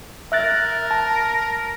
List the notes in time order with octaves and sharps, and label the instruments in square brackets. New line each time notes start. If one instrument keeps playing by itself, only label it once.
[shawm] A#4 [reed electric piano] E5 F#6 A6
[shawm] A#4
[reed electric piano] A5